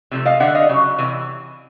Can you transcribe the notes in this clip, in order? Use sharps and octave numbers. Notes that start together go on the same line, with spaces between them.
C3 F3 A3
D#5 F5
D3 G3 E5 F#5
D#5 F5
C#3 F#3
C3 E3